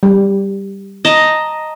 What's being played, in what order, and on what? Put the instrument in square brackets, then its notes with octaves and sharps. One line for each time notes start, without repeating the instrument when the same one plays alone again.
[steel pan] G3
[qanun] D#5 A5 A#5